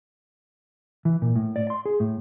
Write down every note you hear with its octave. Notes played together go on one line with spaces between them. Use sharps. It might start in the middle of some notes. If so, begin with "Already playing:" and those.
E3
A#2
A2
D5
C6
G#4
A2